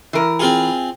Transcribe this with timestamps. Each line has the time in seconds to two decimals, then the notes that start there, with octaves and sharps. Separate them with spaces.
0.13 E3 A#4
0.40 C4 F4 G#4